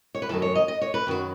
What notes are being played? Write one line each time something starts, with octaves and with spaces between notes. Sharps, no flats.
C#5
B4
F#2 D#3 F#3 A4
C#5
D#5
D#5
C#5
B4
F#2 D#3 F#3 F#4